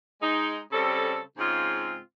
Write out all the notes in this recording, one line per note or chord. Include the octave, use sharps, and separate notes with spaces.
G#3 D#4
C#3 G3 C4 A4
G#2 C#3 G#3 C4 F4